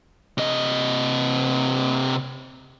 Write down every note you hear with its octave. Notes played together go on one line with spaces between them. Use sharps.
C3 D#5